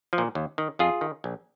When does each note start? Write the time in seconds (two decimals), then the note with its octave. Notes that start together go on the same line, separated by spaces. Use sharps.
0.13 F3
0.18 A#2
0.35 D#2
0.58 D#3
0.79 F2 F4 G#4
1.01 D#3
1.24 A#1